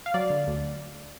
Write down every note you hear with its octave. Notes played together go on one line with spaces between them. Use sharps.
F5
F#3 D5
D3
D2